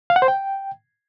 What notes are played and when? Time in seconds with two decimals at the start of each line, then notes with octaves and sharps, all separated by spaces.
0.10 F5
0.16 F#5
0.22 C5
0.28 G5